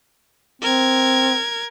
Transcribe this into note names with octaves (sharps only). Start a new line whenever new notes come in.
C4 A#4 G#6